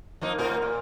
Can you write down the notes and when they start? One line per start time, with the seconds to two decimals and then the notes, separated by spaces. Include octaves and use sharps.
0.21 F3 A#3 D#4
0.38 A2 A#4
0.62 A#2